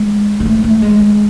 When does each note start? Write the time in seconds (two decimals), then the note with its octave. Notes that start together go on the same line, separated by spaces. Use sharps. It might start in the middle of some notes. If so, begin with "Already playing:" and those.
Already playing: G#3
0.40 G#3
0.45 A3
0.64 A3
0.82 G#3
1.00 G#3